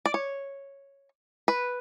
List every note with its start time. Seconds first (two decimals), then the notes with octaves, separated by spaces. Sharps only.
0.06 D5
0.14 C#5
1.48 B4